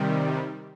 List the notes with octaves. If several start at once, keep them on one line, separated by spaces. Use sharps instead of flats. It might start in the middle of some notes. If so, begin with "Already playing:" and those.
Already playing: C3 D#3 G3